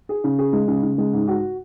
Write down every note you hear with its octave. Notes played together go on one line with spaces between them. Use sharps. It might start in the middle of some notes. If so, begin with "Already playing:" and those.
G#4
C#3
G#4
G#3
C#3
C#3
G#3
G#2
F#4